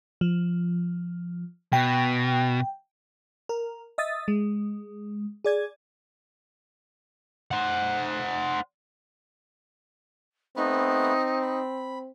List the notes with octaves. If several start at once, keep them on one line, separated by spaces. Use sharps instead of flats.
F3
B2 G5
A#4
D#5 E5 D#6 A6
G#3
G#4 D5 G#6
C5 F#5
A3 B3 C4 D#4 B5
B5